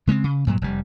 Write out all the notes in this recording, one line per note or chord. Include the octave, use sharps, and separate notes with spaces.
C#3 G#3 A3 C4
C#3
G2 A#2 F#3
F1 G3